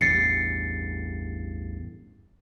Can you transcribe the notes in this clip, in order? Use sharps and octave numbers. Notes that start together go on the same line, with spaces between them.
A1 E2 G2 A6 C7 C#7